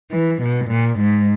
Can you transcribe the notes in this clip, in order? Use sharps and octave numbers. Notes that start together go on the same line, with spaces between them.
E3
B2
A#2
G#2